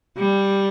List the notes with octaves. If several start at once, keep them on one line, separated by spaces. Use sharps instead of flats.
G3